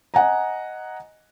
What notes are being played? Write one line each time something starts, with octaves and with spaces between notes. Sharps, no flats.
D#5 F#5 G#5 A#5